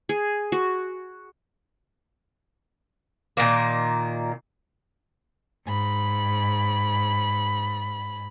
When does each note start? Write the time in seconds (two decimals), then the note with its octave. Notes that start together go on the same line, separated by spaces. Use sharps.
0.09 G#4
0.52 F#4
3.37 A#2 D#3 A#3
5.66 G#2 B5